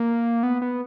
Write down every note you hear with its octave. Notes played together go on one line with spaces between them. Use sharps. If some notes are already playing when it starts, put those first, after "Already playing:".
Already playing: A#3
B3
B3